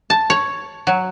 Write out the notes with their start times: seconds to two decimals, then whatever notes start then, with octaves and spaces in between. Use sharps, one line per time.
0.10 A5
0.30 C#5
0.87 F#3